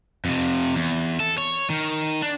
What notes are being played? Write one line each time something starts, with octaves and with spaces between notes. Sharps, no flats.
F2 C3
E2
A4
C#5
D#3
D4